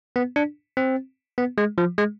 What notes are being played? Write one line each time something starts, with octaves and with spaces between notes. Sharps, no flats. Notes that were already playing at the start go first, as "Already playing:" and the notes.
B3
D4
C4
B3
G#3
F3
G#3